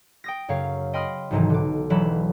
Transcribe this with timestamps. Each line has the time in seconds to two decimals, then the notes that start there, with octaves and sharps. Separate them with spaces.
0.24 G5 D#6 A#6
0.48 F#2 C#3 C#5 F5
0.93 D#5 G5 B5 C6 D#6 F6
1.31 B1 G#2 C3 D#3 E3
1.50 D3 D6
1.90 E1 E3 F#3 B5 E7